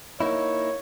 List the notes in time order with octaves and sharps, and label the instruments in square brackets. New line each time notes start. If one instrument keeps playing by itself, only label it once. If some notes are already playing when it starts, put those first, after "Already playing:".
[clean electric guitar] A#3 D#4 E4 [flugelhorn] C#5